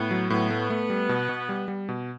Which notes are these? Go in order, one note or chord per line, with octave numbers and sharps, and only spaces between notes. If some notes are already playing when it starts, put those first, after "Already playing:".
Already playing: A2 B3
F#3
A2 B3
A3
A3
G3
B2
B2
G3
G3
B2